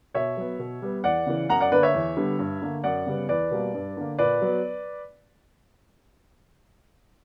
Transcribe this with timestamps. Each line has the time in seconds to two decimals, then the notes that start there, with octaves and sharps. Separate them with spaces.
0.14 B2 C#5 E5
0.37 F#3 B3
0.59 B2
0.82 G3 B3
1.04 E2 D5 F#5
1.26 C#3 E3
1.49 F#2 F#5 A#5
1.61 D5 F#5
1.72 D3 A#3 B4 D5
1.83 C#5 E5
1.94 E2
2.17 D3 G3 B3
2.39 G2
2.62 D3 A#3
2.84 F#2 D5 F#5
3.06 C#3 G3 B3
3.29 E2 B4 D5
3.51 B2 G3 A#3
3.74 G2
3.97 D3 A#3
4.19 A#2 B4 D5
4.42 F#3 B3